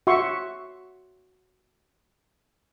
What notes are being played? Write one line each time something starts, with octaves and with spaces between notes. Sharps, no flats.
F#4 E5 C6 C#6